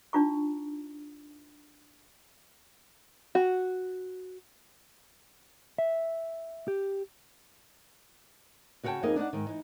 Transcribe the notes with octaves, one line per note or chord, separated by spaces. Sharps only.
D4 D#4 F4 A#5 C#6
F#4
E5
G4
C#3 F#4 C#5 F5 G5 A5
F2 A#3 D#4 G#4 A#4 D#5
D4 D#4 C#5 F#5
G#2 D#3
E3 D#4